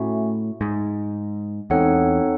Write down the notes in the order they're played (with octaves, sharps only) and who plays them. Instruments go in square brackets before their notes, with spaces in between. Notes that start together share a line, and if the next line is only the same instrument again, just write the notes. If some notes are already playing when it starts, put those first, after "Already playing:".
Already playing: [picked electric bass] A2 [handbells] A3 C#4 F#4
[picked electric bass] G#2
[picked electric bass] E2 [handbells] C4 D#4 A4 C#5 F#5